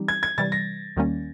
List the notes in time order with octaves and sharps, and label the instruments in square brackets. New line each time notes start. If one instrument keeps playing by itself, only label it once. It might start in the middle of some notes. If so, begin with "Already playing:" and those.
Already playing: [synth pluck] E3 G3 C4 D#4 G4
[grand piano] G#6
G#6
[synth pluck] C3 E3 G3 [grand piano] A6
[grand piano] A#6
[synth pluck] D#2 D#3 G3 A#3 C#4